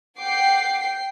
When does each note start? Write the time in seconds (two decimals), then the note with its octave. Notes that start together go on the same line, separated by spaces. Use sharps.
0.19 F#5 G5 D6 C7
0.80 G5 C7